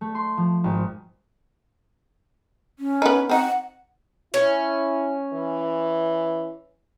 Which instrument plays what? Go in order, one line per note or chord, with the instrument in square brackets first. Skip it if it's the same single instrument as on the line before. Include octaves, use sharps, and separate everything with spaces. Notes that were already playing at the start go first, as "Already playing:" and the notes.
[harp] A3
C6
F3
G#1
[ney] C#4
[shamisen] B3 D#4
[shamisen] C4 D#4 [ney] F#5
[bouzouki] C#4 [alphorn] E4
[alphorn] E3